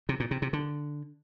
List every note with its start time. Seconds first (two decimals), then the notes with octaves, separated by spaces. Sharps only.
0.09 C3
0.20 A#2
0.31 C3
0.42 C3
0.53 D3